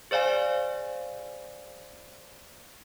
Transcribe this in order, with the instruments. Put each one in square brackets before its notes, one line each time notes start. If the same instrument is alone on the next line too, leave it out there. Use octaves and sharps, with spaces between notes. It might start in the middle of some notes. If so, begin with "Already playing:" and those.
[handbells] G#4 C5 D5 F5 G#5